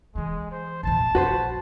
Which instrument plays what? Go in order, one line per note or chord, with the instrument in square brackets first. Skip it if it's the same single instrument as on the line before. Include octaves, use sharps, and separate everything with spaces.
[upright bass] D3 E3 [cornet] G#3
[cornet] C5
[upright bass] A#1 E2 [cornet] A5
[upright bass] A#1 F2 [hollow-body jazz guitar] F#4 B4 C5